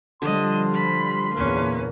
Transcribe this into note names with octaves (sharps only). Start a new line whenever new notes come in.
D3 F3 G3 D#5 C6
B5
E2 A#2 A#3 C#4 B4